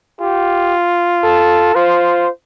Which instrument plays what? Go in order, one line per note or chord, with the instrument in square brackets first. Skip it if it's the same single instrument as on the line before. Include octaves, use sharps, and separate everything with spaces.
[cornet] F4 [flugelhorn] G4
[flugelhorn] A4
[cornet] F4 [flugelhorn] C5